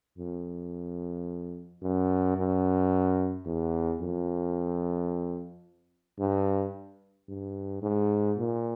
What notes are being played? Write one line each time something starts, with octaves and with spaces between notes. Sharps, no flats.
F2
F#2
F#2
E2
F2
G2
G2
G#2
A#2